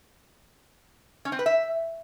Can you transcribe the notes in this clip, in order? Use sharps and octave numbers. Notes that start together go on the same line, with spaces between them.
C#4
C4
B4
E5